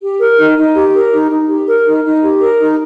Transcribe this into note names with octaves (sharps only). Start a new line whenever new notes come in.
G4
A#4
D#4
D#4
G4
A#4
D#4
D#4
G4
A#4
D#4
D#4
G4
A#4
D#4